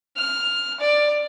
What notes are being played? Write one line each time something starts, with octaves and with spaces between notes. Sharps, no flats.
F6
D5